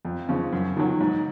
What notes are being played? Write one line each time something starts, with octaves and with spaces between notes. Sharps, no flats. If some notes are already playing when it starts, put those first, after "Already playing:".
F2
C#3 F3
F#2
D#3 F#3
G#2